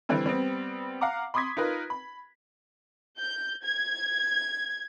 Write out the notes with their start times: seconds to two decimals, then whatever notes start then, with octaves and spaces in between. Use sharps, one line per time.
0.09 D3 E3 G3 C4
0.26 G3 B3 C4
1.01 F5 F#5 A#5 D6
1.34 B5 C6 D6 D#6 G#6 B6
1.57 D#4 F4 A#4 B4
1.90 B5
3.19 G6
3.64 G#6